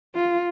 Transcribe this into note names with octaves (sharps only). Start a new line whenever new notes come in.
F4